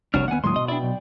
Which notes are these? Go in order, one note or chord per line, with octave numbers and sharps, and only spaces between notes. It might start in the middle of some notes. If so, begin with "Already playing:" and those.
F1 C2 D4 F#4 C#5 F6
D#2 A#3 B3 F#5 G#5
D#2 A2 F#3 G#3 C6 D#6
B2 D#5
D4 E4 D5 G5
B1